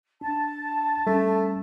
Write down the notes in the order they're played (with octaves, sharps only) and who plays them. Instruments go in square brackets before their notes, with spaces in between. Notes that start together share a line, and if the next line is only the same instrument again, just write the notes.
[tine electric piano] D4 [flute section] A5
[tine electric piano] G3 C#4 [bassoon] A3